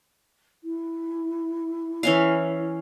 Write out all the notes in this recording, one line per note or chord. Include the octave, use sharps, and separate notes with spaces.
E4
E3 C#4 F5